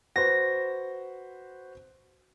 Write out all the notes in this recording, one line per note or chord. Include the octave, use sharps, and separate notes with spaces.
F#4 B4 C5 A#6